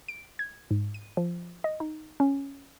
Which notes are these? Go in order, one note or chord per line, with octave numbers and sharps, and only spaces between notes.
D7
G#6
G#2
D#7
F3
D#5
D#4
C#4